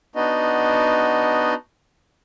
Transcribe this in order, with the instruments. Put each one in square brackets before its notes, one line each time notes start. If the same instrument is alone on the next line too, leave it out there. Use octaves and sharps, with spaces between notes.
[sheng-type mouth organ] B3 D4 D#4 F#4 D#5